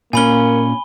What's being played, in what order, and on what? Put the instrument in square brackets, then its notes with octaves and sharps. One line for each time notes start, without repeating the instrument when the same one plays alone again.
[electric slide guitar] A#2 C#4 [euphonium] A#3 [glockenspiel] G#5 B5 G7